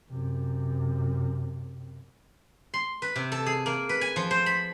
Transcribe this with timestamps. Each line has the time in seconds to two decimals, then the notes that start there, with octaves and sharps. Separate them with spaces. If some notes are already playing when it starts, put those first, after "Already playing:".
0.10 F#2 C3
2.74 C6
3.02 B4
3.16 C3
3.32 A4
3.46 G#4
3.66 A#3
3.89 B4
4.01 G#5
4.16 F3
4.31 C5
4.46 B5